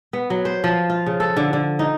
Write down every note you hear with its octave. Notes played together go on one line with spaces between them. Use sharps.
B3
F#3
C5
F3
F4
C#3
A4
D3
D3
D#4